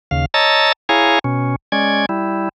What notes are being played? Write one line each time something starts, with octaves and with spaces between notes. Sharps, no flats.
D#2 C#3 F5
C#5 D#5 A5 A#5 E6 A6
E4 G#4 C#5 F5 G#5 A#5
B2 C#4
G#3 C#4 D5 G#6
G3 E4